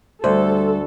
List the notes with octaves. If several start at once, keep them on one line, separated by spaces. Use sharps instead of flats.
D2 G3 A4 C5